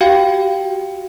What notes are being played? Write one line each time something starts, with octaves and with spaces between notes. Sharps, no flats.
F#4 G4 F5 G5